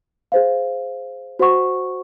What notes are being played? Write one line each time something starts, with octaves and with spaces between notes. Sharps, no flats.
G#4 C5 F5
F#4 C5 F#5 C#6